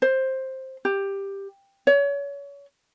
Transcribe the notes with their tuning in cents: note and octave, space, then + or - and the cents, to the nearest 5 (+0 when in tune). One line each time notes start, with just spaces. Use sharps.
C5 +10
G4 +10
C#5 +30